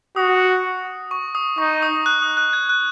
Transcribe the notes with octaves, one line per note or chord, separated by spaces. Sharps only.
F#4 D#6
C#6
D#6
D#4 C#6
D#6
F#6
D#6
F#6
G#6
F#6